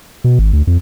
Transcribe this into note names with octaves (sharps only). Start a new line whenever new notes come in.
B2
G#1
D2
F2